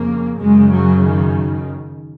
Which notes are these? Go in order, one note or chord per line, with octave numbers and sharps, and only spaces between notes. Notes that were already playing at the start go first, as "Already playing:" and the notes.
Already playing: F2 C#3 A#3
F#2 C#3 G#3
F#3
D#3